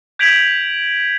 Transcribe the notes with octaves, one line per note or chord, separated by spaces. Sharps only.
G6 G#6 B6 D7 F7 F#7